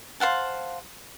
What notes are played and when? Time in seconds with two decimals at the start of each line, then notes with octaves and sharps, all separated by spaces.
0.20 C5 F5 F#5 A5